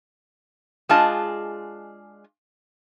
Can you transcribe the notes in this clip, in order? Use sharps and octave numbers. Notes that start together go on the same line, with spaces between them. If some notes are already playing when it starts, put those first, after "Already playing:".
G#3 D4 F4 G#4 D#5 A5